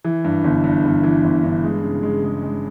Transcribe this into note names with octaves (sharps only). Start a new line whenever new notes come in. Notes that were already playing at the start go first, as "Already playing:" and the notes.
E3
G2
G1
G2
G1
E3
G1
G2
G#3
C#3
G#3
G#3
G#3